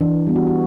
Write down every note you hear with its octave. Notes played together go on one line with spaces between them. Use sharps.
E3 D4
G3 B3
F#4
F#4